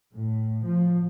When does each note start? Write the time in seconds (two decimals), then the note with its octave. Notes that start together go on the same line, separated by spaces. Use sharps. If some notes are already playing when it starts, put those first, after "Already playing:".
0.14 A2
0.65 F3